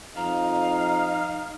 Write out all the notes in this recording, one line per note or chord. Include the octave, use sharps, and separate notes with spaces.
F2 D#4 F5 A#5